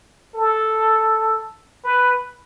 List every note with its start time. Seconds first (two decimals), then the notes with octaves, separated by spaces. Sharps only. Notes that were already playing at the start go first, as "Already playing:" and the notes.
0.35 A4
1.84 B4